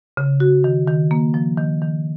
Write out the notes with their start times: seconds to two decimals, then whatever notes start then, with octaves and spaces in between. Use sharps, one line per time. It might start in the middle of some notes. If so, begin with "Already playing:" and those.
0.17 C#3
0.40 F#4
0.64 D#3
0.88 D#3
1.11 A#3
1.34 F3
1.58 D#3
1.82 D#3